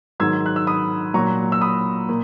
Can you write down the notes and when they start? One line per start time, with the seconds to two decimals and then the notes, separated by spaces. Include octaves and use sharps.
0.20 G#2 D#3 F#3 E6 G#6
0.46 F#6
0.56 E6
0.67 B5 D#6
1.14 A#2 F#3 A#5 C#6
1.52 E6
1.61 B5 D#6
2.09 A#2